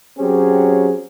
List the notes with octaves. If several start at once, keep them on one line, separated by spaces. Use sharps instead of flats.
F#3 C4 C#4 G4 G#4